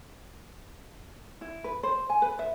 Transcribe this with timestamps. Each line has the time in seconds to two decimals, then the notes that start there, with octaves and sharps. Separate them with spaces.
1.41 E4
1.64 B4
1.83 C5
2.09 G#5
2.22 B4
2.39 E5